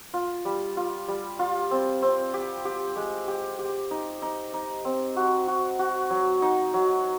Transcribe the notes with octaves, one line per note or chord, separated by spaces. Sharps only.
F4
G3
F4
G3
F4
C4
C4
G4
G4
G#3
G4
G4
D#4
D#4
D#4
C4
F#4
F#4
F#4
F#3
D#4
F#3